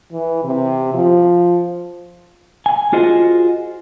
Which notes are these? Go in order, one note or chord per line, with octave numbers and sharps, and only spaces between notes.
E3
C3
F3
G#5
F4 F#4 G#4 C5 D#5 G#5